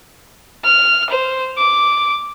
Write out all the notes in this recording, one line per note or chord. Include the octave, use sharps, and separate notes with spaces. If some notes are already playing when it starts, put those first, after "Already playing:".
F6
C5
D6